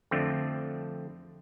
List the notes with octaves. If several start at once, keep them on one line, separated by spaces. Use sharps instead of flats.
F2 D3 A3 C4